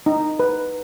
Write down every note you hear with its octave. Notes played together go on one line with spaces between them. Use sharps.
D#4
B4